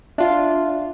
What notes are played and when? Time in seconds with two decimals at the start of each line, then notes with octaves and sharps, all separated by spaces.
0.18 D4 F4 E5